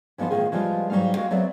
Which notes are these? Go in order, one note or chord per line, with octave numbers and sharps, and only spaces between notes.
E3 F3 B3 D#4 C5
A2 D#3 F4 G#4
E3 F3 G3 G#3 F4
G#2 F#3 G3 C4 D#4 F5
G#3 F#4 F5 G5
F#3 G#3 B3 C4 D5 E5